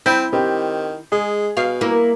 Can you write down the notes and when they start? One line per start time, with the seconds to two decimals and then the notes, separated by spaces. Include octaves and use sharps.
0.06 C4 E4 G6
0.33 D#3 C4 G4
1.12 G#3 G#4
1.57 B2 F5
1.81 A#3 E4